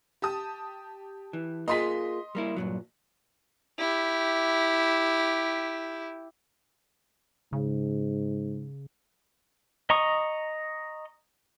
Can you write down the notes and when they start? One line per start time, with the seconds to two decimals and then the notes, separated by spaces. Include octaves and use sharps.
0.22 G4 A5 D#6
1.33 E3
1.68 A#3 F4 G#4 D#5 C6 B6
2.35 G3 A#3 E4
2.56 G2 A#2 F#3
3.79 E4 G4
7.53 G#2 C#3
9.90 D#5 A#5 C#6 D#6